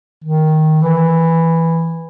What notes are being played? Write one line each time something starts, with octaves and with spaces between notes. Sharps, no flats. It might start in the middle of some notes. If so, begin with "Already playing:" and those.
D#3
E3